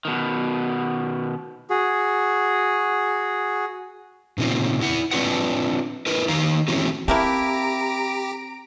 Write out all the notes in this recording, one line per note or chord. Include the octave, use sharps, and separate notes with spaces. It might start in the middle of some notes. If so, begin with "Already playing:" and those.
B2 D#3
F#4 G#4
A#2 C#3 C4 D#4 F4
E4 F#5
C4 D4 F4 B4 F#5
E4 A#4 B4
D#3 D#4 F5 A#5
E3 A3 C4 C#4 E4 F#4
A3 A#3 C4 E4 G4 A#5 D7